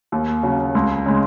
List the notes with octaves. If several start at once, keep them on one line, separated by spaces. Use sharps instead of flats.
D#2
C#3 F#3
C#2
C#3 G#3